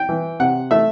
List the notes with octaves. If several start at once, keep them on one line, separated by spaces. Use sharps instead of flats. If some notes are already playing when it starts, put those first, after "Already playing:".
Already playing: G5
E3
C3 F#5
A3 E5